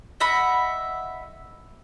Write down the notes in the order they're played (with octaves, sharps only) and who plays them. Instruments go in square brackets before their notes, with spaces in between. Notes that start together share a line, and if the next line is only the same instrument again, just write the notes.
[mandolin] D#5 E5 F#5 B5